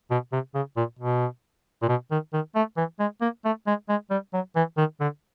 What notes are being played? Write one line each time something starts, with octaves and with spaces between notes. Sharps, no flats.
B2
C3
C#3
A#2
B2
A#2
B2
D#3
D#3
A3
E3
G#3
A#3
A3
G#3
G#3
G3
F#3
E3
D#3
D3